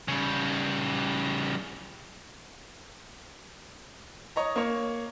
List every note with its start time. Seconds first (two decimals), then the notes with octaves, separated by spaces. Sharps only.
0.08 C#3 G3
4.36 C#5 D#5 A#5
4.56 A#3 C#5